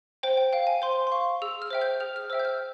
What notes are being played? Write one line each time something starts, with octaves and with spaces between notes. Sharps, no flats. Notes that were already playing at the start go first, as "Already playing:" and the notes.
C5 G5
G5
F5 G5
G#5
C5 C6
C6
F5 C#6
G#4 E6
F6
C5 E5 G5
G6
G#4 F6
F6
C5 E5 G5 E6
G6
F6